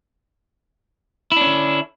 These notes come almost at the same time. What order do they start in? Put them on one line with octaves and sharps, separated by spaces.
E4 D4 C#4 D3